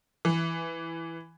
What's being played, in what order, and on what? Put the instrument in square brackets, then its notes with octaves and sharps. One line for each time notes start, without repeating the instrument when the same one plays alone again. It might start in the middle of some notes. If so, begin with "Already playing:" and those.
[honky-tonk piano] E3